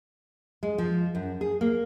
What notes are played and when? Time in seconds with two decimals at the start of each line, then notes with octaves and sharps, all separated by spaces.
0.63 G#3
0.78 F3
1.15 F#2
1.41 G#4
1.61 A#3